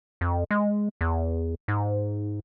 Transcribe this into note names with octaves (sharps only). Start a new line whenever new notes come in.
F2
G#3
E2
G#2